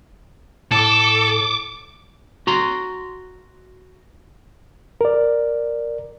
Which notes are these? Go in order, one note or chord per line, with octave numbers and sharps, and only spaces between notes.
A2 A4 D6
F#4 A#5 C6
A#4 D5